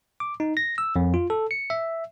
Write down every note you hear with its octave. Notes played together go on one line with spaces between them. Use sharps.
D6
D#4
A#6
E6
F2
F4
A4
C#7
E5